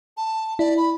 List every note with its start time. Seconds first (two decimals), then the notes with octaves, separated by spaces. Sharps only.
0.17 A5
0.59 E4 D5
0.77 B5